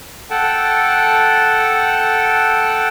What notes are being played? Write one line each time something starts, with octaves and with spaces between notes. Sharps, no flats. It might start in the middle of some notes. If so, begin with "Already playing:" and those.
A4 F#5 G5 A5